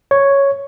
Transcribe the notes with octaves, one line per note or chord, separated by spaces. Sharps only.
C#5